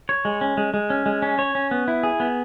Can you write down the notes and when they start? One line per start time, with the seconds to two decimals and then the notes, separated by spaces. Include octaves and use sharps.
0.09 C#5
0.25 G#3
0.41 C#4
0.57 G#3
0.74 G#3
0.90 C#4
1.06 G#3
1.22 C#4
1.39 C#5
1.55 C#4
1.71 B3
1.88 E4
2.03 G#4
2.20 B3